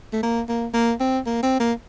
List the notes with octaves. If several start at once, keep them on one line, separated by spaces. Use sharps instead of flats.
A3
A#3
A#3
A#3
C4
A#3
C4
A#3